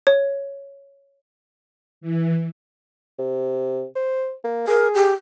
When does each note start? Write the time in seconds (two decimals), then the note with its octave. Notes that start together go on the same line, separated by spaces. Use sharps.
0.07 C#5
2.01 E3
3.19 C3
3.96 C5
4.44 A#3
4.68 G#4 A#4
4.95 G4